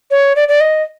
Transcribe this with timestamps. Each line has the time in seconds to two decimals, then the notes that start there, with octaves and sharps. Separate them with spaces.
0.11 C#5
0.36 D5
0.49 D5
0.61 D#5